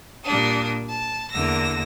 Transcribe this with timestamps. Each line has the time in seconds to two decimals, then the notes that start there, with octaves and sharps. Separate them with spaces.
0.24 A#2 G3 D4 D#6
0.87 A5
1.31 E2 D3 A#3 E6 A#6